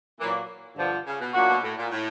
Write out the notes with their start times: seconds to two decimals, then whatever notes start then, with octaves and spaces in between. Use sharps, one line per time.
0.20 A#2 E3 F#3 A#3
0.77 G2 D3 F3
1.06 C#3
1.19 B2
1.33 A#2 F#3 A#3 D4 F#4
1.48 B2
1.62 A2
1.77 A#2
1.91 A2